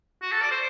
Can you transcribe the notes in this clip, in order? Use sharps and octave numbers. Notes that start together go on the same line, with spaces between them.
F#4
A4
D5
C5